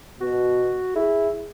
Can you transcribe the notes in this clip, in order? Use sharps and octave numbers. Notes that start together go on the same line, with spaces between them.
B2 F#4
E4 G#4